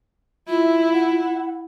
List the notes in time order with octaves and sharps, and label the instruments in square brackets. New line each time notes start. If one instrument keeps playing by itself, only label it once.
[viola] E4 [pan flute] F4 [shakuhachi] E5
[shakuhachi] F#5